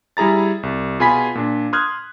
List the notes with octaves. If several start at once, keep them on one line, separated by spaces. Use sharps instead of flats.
G3 E4 G#4 A#5 A6
C2
B2 F4 G#4 G#5 B5 B6
A#2 D4
C6 D#6 F6 F#6 G#6